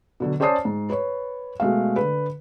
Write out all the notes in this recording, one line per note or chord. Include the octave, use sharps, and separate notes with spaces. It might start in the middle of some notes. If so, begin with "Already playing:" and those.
B2 D3 F#3
C#4 C5 D5 A5 D#6 C7
G#2
B4 C#5
B2 G#3 A3 F5
D3 B4